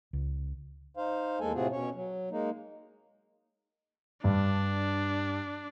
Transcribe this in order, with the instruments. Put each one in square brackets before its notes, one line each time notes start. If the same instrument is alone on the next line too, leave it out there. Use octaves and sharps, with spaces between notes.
[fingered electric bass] C#2
[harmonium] D#4 C5 F5
E2 G#3 A#3 A4 G#5
A2 C3 C4 F4 F#4 G#4
B2 C#4 C#5
F#3
G#3 A#3 D#4
[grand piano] G2 [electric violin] D4